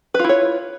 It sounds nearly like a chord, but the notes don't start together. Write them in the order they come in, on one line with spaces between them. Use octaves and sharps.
B4 F4 E4 C#5